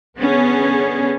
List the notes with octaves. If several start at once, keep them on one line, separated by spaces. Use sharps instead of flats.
D3 B3 C#4 G#4